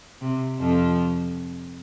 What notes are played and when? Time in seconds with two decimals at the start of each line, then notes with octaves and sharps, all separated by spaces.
0.21 C3
0.59 F2 F3